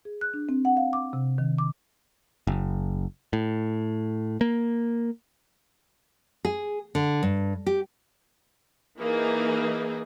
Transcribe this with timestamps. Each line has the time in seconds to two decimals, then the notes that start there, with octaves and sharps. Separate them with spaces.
0.05 G#4
0.21 F#6
0.34 D4
0.49 C4
0.65 F#5
0.77 F5
0.93 D6
1.13 C3
1.38 D#3
1.59 D6
2.47 F#1
3.33 A2
4.41 A#3
6.45 G#4
6.95 D3
7.23 G2
7.66 G4
8.99 E3 A#3 D#4 G#4